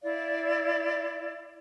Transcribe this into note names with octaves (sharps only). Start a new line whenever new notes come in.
E4 D5 F5